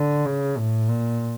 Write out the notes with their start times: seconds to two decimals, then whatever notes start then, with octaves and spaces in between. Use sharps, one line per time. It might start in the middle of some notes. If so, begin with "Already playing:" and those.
Already playing: D3
0.26 C#3
0.58 A2
0.89 A#2